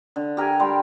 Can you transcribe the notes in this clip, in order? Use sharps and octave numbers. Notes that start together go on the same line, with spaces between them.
D3
G4 A#4 E5 G#5
G3 G5 C6